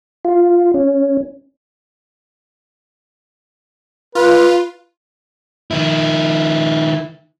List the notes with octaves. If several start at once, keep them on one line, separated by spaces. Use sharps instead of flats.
F4
C#4
F4 B4
D#3 E4